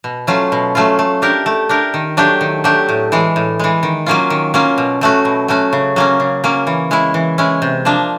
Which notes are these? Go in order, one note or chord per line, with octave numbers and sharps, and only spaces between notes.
B2
F#3 A3 C#4 F4
B2
F#3 A3 C#4 F4
A3
D4 G4 A#4
A3
D4 G4 A#4
D#3
F#3 A3 D4 G4
D#3
F#3 A3 D4 G4
A2
E3 G#3
A2
E3 G#3
D#3
F#3 A#3 C#4 F4
D#3
F#3 A#3 C#4 F4
B2
F#3 A3 C#4 F#4
B2
F#3 A3 C#4 F#4
C#3
F#3 A#3 C#4
C#3
F#3 A#3 C#4
E3
G#3 C#4 E4
E3
G#3 C#4 E4
C3
F3 A#3 D4